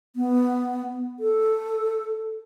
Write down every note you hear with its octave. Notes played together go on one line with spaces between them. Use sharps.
B3
A4